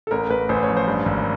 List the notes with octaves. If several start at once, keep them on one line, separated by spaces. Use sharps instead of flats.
A4
A1 A#4
A1 B4
A1 C5
C#5
F3
C5
G2
G#1